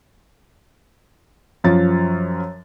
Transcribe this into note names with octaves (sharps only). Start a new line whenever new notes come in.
F#2 F3 C#5 A6